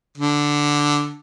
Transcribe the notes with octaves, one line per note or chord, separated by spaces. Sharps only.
D3